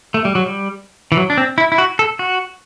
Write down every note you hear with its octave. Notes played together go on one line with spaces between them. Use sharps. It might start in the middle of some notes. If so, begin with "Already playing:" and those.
A3
G3
F#3
G3
E3
F#3
D4
C4
E4
E4
F#4
A4
F#4